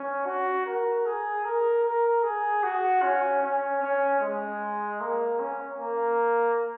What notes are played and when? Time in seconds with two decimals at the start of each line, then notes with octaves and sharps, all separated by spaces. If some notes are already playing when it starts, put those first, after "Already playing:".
Already playing: C#4
0.26 F#4
0.66 A#4
1.06 G#4
1.45 A#4
1.84 A#4
2.23 G#4
2.64 F#4
3.03 C#4
3.42 C#4
3.82 C#4
4.21 G#3
5.01 A#3
5.40 C#4
5.79 A#3